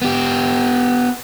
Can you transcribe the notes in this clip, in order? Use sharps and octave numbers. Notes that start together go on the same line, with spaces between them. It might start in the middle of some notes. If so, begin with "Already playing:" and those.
B3 G4